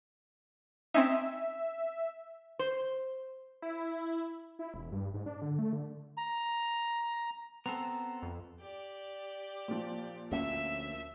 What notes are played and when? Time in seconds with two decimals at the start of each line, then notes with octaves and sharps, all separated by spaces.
0.94 C4 C#4 D#4 E5
2.59 C5
3.62 E4
4.59 E4
4.74 E1
4.92 G2
5.14 G#2
5.26 D4
5.42 D3
5.59 A3
5.73 D3
6.17 A#5
7.66 B3 C4 A4 A#5
8.22 F2
8.60 G4 D5
9.68 A#2 F3
10.32 D2 A#3 C#4 E5